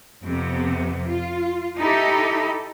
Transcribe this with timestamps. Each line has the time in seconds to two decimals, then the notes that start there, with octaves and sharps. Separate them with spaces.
0.22 F2 C3 B3
1.08 F4
1.77 D#4 E4 G4 A4